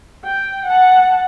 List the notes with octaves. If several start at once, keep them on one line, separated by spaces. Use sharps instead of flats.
G5
F#5 A5